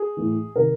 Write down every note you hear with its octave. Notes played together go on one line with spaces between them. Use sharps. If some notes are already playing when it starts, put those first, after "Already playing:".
Already playing: G#4
A2 E3
C3 D#3 A#4